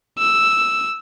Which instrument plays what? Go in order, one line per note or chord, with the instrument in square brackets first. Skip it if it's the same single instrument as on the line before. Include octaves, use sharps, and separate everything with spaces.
[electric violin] E6